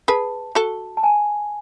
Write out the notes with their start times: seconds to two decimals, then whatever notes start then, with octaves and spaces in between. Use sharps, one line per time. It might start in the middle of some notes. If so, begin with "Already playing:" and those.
0.08 G#4 B4 A5
0.55 F#4 A4 A5
0.97 A5
1.03 G#5